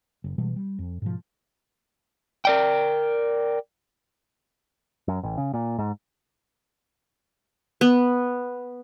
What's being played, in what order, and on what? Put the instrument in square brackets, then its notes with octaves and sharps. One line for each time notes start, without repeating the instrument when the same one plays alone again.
[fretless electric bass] F#1
B2 E3 G3 G#3
G3
F2
G#2 B2 F3
[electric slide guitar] A#4 D5 G5
[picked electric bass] F#2
A1
C#3
A#2
G#2
[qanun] B3